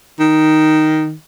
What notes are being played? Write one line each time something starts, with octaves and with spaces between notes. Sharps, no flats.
D#3